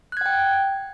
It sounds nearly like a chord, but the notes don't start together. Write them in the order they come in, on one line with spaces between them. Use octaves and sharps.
F#6 G#6 F#5 G5